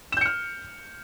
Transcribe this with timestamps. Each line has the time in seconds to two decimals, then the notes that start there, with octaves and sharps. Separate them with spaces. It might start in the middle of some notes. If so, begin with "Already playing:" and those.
0.12 E7
0.17 G6
0.21 C#7
0.26 F6